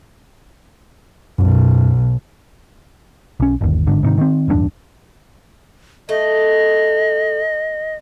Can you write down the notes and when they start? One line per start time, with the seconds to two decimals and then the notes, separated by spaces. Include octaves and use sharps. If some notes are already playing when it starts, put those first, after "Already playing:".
1.38 B1 F#2
3.40 B1 C#4
3.61 G1 D#2
3.87 G1 G#2 D3
4.03 G#2 C3 D#3
4.18 D#3 C4
4.48 D1 E2 G2 D4
6.09 A3 D#5